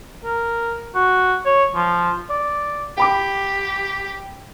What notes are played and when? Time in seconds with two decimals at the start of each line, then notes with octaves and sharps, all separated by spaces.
0.24 A#4
0.95 F#4
1.45 C#5
1.74 F3
2.30 D5
2.97 G4 G5 B5 D6